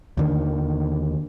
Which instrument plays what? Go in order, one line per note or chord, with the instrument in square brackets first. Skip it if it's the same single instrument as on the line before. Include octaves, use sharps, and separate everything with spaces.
[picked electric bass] D#2 D3 D#3